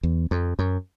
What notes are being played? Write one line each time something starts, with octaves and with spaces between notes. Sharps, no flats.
E2
F2
F#2